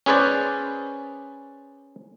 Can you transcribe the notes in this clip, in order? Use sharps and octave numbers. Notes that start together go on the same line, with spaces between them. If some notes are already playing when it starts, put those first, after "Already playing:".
C#4 G#4 B4 C5 D5